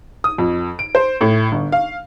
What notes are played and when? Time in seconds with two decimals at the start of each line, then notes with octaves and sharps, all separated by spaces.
0.24 D#6
0.38 F2
0.79 D7
0.95 C5
1.21 A2
1.52 G1
1.72 F5